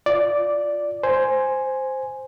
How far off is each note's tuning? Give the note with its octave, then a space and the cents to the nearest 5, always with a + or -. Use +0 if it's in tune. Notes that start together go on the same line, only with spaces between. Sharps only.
F4 +0 D5 +0
C5 +0 G#5 +0